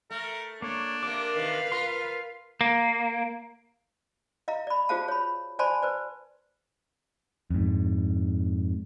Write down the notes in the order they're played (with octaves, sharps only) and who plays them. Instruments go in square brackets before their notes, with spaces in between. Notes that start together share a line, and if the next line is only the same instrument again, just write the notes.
[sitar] A3 [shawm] A#4
[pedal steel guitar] A#3 C#5 [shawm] D4
[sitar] C3 A#3 [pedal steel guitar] D6
[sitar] C3 D#3 [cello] B4 F5
[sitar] F4 A#4 [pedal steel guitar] C6
[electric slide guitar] A#3
[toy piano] D#5 F5 A#5
D5 B5
F4 F#4 G#4 C5 F5 A5
C#5 B5
C5 D5 G#5 A5 B5 C6
B4 C5 D5
[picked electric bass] F2 G#2